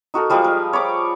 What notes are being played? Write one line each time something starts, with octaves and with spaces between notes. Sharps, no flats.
D#4 F#4 A4 A#4
F3 G3 G#3 G#4
A#4
C#5 B5 D6